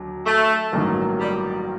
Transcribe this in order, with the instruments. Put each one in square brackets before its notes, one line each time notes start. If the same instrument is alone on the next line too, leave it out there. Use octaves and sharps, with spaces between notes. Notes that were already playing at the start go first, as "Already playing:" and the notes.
Already playing: [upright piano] D#2 D3 F#3
[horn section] A3
[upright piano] A1 G2 D#3 F#3 A#3
[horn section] G3